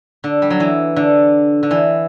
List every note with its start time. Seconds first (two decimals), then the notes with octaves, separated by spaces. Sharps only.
0.24 D3
0.42 G3
0.50 F#3
0.60 E3
0.96 D3
1.63 D3
1.71 E3